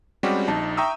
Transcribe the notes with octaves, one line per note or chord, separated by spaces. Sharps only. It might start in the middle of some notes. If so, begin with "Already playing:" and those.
G3 G#3 C4 C#4 F#4 G4
A#1 D#4 A5
E5 G5 A#5 C#6 D#6 E6